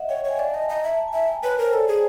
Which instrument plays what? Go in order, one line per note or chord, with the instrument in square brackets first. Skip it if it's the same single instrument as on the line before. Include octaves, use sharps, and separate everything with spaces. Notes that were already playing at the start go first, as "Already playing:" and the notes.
Already playing: [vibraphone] D#5 E5 F#5
[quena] C#5 [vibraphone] G5
[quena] C#5 [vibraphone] G#5
[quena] D5
[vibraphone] A5
[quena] D#5
[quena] D#5 [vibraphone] A#5
[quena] E5
[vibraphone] A5
G#5
[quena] E5
[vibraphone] G5
[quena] B4 [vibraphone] C#5
[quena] A#4 [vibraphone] C5
[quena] A4 [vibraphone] D5
[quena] G#4